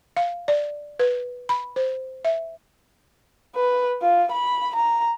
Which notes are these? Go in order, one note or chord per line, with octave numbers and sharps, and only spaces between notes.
F5
D5
B4
B5
C5
E5
B4
F4
B5
A#5